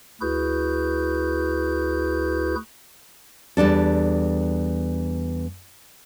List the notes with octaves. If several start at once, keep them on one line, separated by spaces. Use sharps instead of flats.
D2 E4 F#4 G#4 B4 G6
E2 G3 D4 A4